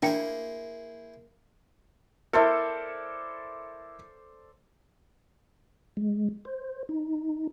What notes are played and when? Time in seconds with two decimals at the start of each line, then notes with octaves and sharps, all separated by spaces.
0.02 A#3 D4 E4 G#4 C5 G5 C#7
2.33 E4 A4 A#4 C5 D5
5.97 G#3
6.45 C5
6.89 D#4